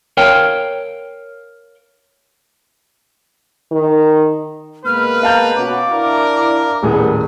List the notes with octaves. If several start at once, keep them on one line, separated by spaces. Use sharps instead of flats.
A#4 C#5 F5 G5
D#3
B2 G#3 A#3 B4 F6
F5 A5 A#5 G6
B2 C#4 F#4 D6
D4 E4 A#4
D#1 A2 G3 B3 G#4 A#4